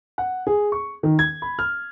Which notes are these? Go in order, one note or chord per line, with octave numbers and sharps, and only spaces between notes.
F#5
G#4
C#6
D#3
G#6
B5
F6